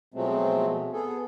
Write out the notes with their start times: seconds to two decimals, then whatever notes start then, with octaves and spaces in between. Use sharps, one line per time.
0.14 B2 F3 F#3 G#3 A3 C4
0.93 B3 G#4 A4